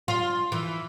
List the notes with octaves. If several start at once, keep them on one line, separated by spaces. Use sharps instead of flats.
F4
E3